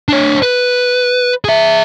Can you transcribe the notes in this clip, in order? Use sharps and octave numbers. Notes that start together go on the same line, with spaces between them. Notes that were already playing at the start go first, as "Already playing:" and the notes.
D4 C#5
B4
G#4 E5